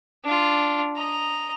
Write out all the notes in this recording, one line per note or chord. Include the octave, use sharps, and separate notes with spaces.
D4 F4
D#5 A#5